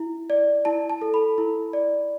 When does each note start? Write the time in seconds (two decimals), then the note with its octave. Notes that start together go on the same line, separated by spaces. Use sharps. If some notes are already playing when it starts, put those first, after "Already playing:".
Already playing: E4
0.30 D5
0.65 E4 A5
0.90 A5
1.01 A4
1.14 B5
1.38 E4
1.73 D5